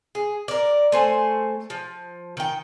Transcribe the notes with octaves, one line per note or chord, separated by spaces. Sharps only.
G#4
A#4 D5
A3 C5 G#5
F3
D#3 G5